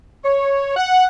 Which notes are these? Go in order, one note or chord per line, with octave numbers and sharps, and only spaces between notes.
C#5
F#5